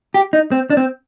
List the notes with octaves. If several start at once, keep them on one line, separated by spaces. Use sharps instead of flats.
G4
D#4
C4
D4
C4